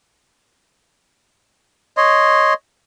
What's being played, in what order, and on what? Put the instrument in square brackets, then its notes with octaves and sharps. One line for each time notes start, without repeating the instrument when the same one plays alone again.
[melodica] C#5 D#5 C6